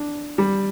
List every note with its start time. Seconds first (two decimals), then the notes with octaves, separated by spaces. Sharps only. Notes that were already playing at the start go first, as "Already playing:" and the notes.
Already playing: D4
0.38 G3